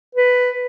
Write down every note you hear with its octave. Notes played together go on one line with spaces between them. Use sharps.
B4